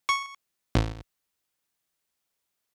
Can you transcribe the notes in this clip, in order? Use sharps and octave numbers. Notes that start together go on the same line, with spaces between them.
C#6
A1